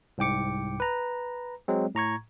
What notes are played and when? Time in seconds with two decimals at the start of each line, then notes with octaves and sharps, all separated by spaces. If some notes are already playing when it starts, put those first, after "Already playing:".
0.18 C2 G#2 G5 D6 C#7
0.80 B4 A#5
1.68 F#3 G#3 C4
1.95 A2 A#5 C#6 G#6